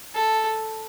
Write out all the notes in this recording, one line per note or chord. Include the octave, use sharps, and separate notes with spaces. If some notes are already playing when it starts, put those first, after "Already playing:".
A4